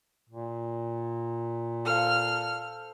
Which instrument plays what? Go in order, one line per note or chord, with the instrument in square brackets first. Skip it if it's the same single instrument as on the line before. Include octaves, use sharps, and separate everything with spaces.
[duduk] A#2
[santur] A4 C5 F5 [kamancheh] F6